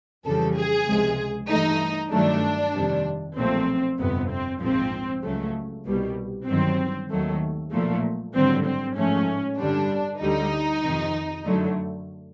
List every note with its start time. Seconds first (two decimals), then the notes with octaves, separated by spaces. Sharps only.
0.25 F2 C#3 E3 G3 A4
0.57 G#4
0.87 C#2 C3 F3 G#3
1.49 G2 E3 A3 D#4
2.12 G1 G2 D#3 F#3 A3 D4
2.73 F2 C3 D#3 G3
3.37 B1 A#2 F3 A3 C4
3.99 G1 F2 C3 B3
4.30 C4
4.60 A#1 G#2 F3 C4
5.24 C#2 C#3 F#3 A3
5.85 C2 B2 G3
6.47 G1 G2 D#3 F#3 C4
7.10 D#2 D#3 F#3 A3
7.72 B1 A#2 F3 A3
8.34 G#1 G2 D3 F#3 C4
8.65 C4
8.96 A1 G#2 F3 A3 C#4
9.59 G2 D3 G3 D4
10.21 D2 D3 G3 D#4
10.83 F2 C3 D#3
11.46 F#2 D3 F#3 A3